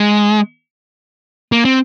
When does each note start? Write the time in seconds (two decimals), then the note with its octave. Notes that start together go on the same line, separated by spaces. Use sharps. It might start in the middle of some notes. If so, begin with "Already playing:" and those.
Already playing: G#3
1.52 A#3
1.65 C4